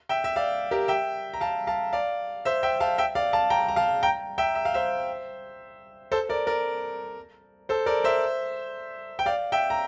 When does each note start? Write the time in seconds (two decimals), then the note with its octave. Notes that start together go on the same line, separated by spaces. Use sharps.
0.09 E5 G5
0.24 E5
0.36 D5 F5
0.71 G4 A#4
0.88 E5 G5
1.34 A#5
1.41 F5 A5
1.67 F5 A5
1.93 D5 F5
2.45 C5 E5
2.63 E5 G5
2.80 F5 A5
2.98 E5 G5
3.15 D5 F5
3.33 F5 A5
3.50 G5 A#5
3.68 A#5
3.76 F5 A5
4.03 G5 A#5
4.38 E5 G5
4.55 E5
4.65 F5
4.74 C5 E5
6.12 A4 C5
6.29 A#4 D5
6.47 A#4 D5
7.69 A4 C5
7.86 A#4 D5
8.04 C5 E5
9.19 G5
9.26 D5 F5
9.52 E5 G5
9.70 A#5